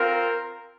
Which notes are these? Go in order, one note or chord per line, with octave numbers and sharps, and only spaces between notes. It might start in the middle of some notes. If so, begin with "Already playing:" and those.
Already playing: C4 F4 A#4